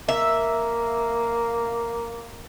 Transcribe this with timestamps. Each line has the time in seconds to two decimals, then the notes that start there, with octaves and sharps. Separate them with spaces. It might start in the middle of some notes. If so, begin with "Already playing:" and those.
0.09 A#3 E5